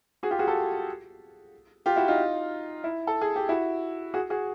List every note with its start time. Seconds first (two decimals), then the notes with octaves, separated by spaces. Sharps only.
0.23 F#4 G#4
0.31 F4 G4
0.39 F#4 G#4
0.47 G4 A4
1.86 F4 G4
1.96 E4 F#4
2.08 D#4 F4
2.84 E4
3.07 A4
3.21 G#4
3.36 G4
3.49 E4 F#4
4.14 F#4 G#4
4.30 F#4 G#4